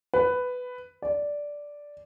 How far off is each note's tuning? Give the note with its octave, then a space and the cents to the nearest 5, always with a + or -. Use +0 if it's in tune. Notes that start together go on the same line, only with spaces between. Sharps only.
B4 +10
D5 -5